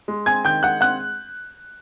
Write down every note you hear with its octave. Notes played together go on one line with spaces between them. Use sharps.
G#3
C4 G#5 G#6
D#3 G5 G6
G#3 F#5 F#6
C4 F#5 F#6